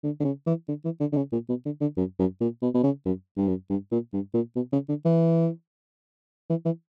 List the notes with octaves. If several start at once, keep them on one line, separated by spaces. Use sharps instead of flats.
D3
D3
C#3
E3
D3
E3
D3
D3
C#3
A#2
B2
D3
D3
F#2
F#2
A#2
B2
B2
C#3
F#2
G2
F#2
G2
A#2
G2
A#2
B2
C#3
D3
E3
E3
E3